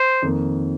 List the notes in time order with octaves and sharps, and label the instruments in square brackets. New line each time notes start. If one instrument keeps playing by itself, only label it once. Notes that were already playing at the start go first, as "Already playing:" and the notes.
Already playing: [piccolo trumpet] C5
[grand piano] F2 D#3 A#3